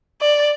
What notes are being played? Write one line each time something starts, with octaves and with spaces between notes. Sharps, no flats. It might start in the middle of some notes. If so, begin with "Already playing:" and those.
D5